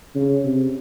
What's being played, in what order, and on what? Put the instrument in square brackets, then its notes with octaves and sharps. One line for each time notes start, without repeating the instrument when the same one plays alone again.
[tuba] C#3
C3